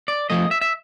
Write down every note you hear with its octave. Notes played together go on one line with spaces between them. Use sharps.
D5
F3 A3 D#5
E5
E5